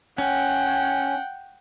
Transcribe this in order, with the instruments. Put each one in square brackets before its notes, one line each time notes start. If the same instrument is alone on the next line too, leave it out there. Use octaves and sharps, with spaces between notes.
[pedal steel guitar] C#4 [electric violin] F#5 G5